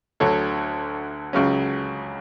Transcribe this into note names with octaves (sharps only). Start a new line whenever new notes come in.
D2 D3 F#3 A4 C#5
C#2 C#3 F#3 C#4